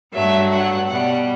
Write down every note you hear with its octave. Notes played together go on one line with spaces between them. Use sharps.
G2 F#3 A3 E5
F#5
B2 G3 F#5